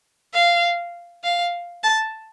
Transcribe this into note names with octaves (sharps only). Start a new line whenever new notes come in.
F5
F5
A5